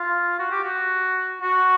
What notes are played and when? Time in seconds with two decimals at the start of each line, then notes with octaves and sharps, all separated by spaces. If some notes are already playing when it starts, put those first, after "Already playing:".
Already playing: F4
0.39 F#4
0.51 G4
0.63 F#4
1.42 F#4